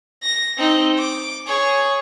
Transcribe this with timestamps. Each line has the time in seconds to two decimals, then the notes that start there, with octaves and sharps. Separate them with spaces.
0.23 A#6
0.57 C4 D#4
0.98 D6
1.47 G#4 C#5